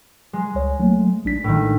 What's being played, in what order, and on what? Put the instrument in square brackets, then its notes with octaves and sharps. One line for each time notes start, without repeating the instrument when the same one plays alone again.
[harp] G#3
[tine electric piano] C#2 C#5
F#3 A3 A#3
A#1 D4 B6
[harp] A2 D#3